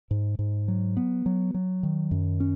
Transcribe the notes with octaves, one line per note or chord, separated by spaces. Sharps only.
G#2
G#2
F#3
B3
F#3
F#3
D#3
F#2
C#4